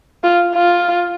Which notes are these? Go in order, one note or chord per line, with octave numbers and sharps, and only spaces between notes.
F4
F4